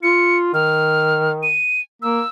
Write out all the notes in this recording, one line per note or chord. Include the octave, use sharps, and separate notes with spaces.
F4 C#7
D#3 F6
D#7
A#3 E6